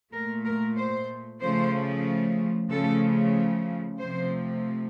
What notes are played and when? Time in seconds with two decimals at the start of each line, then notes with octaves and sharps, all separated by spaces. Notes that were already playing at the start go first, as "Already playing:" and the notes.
0.12 A#2 A3 A#4
0.44 A#4
0.76 C5
1.40 C#3 F3 A3 C5
2.70 C#3 F3 A3 A4
3.98 C3 F3 A3 C5